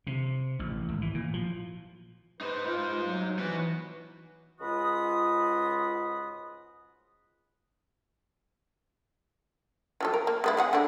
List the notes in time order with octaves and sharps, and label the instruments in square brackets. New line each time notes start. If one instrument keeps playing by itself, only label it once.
[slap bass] C3
A1
G#1
E3
A#2
F3
[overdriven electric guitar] D#4 C5 [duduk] B4
[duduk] F4
F#3
[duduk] E3 [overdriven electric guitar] B3 F#4
[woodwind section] C#2 G#2 F4 F#4 B5 D#6
[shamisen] F3 F#3 A4
A#4
A#3
G#3 B3 E4
G#3 G#4 F#5
D3 A3 D4